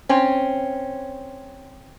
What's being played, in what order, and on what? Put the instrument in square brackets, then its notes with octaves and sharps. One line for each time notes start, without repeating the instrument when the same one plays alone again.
[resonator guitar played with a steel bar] C4 C#4